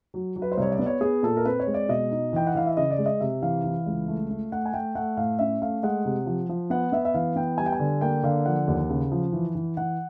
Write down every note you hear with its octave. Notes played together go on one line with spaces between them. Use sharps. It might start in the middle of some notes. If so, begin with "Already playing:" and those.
F#3
F#3
B4
C5
C2 C#5
D5
B3
C#5
B3 G#4
A#2 A4
A#4
C4 B4
C#5
G#3
D5
B2 D#5
D#4
E3 G5
F#5
E3 F5
E5
C#3 D#5
D5
G#3
D#5
C3 E5
E3 F5
E3
C#2
A3
A3
A3 F#5
G#5
A3 G5
A3 F#5
A2 F5
C#4 E5
A3 F5
G#3 F#5
C3
F3
F3
B3 F#5
B3 E5
E5
E3 F5
B3 G5
G3 G#5
G5
G#5
D3
A#3 G5
D3 F5
F3 F#5
D#2
C#3
F3
E3
E3
E3 F#5